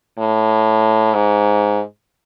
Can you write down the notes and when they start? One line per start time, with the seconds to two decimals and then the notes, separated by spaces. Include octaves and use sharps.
0.19 A2
1.14 G#2